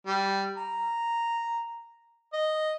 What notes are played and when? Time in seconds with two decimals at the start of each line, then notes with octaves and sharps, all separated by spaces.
0.07 G3
0.57 A#5
2.33 D#5